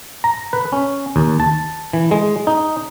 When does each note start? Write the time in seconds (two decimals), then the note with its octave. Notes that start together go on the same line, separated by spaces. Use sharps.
0.24 A#5
0.53 B4
0.72 C#4
1.16 D#2
1.40 A5
1.93 E3
2.11 G#3
2.47 D#4